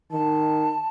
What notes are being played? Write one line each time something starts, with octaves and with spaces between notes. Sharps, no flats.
D#3 A5